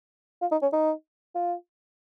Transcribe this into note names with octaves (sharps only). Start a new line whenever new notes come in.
F4
D#4
C#4
D#4
F4